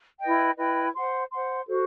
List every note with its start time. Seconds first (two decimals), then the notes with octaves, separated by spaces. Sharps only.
0.21 E4 B4 D#5 G5
0.58 E4 B4 D#5 G5
0.94 C5 F#5 C6
1.31 C5 F#5 C6
1.68 F#4 A4 C5